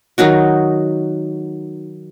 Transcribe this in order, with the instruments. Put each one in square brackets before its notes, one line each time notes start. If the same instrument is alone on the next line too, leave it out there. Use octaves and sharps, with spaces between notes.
[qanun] D#3 F#3 D#4 F#4